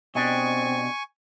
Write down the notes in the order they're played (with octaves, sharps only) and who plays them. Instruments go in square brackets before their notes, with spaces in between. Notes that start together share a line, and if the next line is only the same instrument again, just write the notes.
[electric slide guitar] B2 [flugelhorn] C4 [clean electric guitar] D4 G4 D#5 [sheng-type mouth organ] G#5 C#6